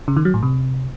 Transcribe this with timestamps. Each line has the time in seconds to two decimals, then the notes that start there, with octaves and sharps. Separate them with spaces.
0.08 C#3
0.17 D#3
0.25 F#3
0.34 A2
0.43 C3